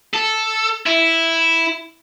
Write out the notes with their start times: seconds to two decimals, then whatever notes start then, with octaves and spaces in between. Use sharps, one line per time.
0.14 A4
0.86 E4